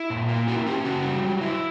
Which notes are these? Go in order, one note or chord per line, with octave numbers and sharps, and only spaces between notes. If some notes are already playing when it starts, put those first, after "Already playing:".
Already playing: E4
A#2
A#3
E4 F#4 A#4
C#4 G4
C#3 F#4
G3
F#3
E4